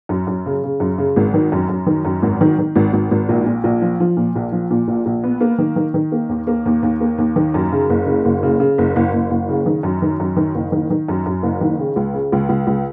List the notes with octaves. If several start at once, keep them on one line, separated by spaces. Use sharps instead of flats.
F#2
F#2
C#3
C#3
F#2
C#3
G#1
D#3
F#2
F#2
D#3
F#2
G#1
D#3
D#3
G#1
G#1
G#1
A#1
A#2
A#1
F3
F3
A#2
A#1
F3
A#2
A#1
A#1
B3
A#3
D#3
D#3
D#3
A#3
D#2
A#3
D#2
D#2
A#3
D#2
D#3
F#2
C#3
F#1
C#3
F#1
C#3
C#3
F#1
F#1
F#1
F#1
C#3
D#3
F#2
D#3
F#2
D#3
F#1
D#3
D#3
F#2
F#2
F#1
D#3
C#3
C#2
C#3
C#2
C#2
C#2